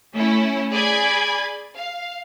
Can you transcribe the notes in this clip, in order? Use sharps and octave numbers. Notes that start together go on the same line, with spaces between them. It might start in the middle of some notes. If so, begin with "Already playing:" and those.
A3 C#4 E4
G#4 D5 G#5 B5 G#6
F5